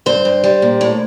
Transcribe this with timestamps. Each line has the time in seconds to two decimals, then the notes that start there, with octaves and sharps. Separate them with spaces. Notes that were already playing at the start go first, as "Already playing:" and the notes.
0.06 G2 C5
0.25 G2
0.44 G3
0.62 A#2
0.81 A2